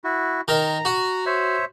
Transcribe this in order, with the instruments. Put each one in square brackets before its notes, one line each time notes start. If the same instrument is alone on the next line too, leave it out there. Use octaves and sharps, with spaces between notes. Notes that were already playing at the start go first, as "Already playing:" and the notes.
[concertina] E4 F#4
[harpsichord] D#3 A#4 [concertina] A#5
[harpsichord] F#4
[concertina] C5 C#5 E5